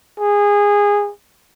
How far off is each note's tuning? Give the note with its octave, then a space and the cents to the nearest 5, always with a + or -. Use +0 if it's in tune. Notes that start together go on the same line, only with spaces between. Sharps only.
G#4 -20